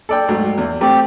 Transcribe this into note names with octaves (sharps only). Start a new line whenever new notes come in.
A4 D5 G5
G#2 F#3 A3
E2
A3 C4 G4